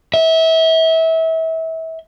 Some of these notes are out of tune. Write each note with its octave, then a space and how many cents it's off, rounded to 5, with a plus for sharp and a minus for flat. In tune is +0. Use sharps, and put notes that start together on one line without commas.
E5 -30